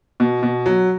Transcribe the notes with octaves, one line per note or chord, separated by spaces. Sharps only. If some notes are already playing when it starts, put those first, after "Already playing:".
B2
B2
F#3